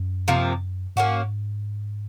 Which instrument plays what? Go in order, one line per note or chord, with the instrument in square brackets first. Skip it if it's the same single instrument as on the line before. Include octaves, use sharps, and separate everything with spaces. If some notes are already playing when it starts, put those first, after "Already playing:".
Already playing: [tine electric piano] F#2
[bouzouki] C3 F3 A#3
[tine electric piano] G#2 [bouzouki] A#3 C#4 F#4